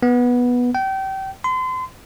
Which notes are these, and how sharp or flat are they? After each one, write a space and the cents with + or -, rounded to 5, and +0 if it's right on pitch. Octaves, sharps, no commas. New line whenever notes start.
B3 -10
G5 -30
C6 -35